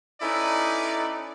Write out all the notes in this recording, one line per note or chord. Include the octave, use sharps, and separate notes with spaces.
C#4 D#4 E4 A4 B4 D5